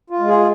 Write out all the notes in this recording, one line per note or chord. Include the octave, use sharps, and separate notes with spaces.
F4
G#3
G#4